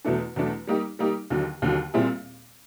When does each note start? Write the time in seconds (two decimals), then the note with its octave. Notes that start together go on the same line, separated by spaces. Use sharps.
0.05 E2 B2 F#3 A3 D4
0.36 E2 B2 F#3 A3 D4
0.67 G3 A#3 D#4 G4
0.99 G3 A#3 D#4 G4
1.30 D#2 D3 F#3
1.62 D#2 D3 F#3
1.94 A#2 G3 C4 E4 G#4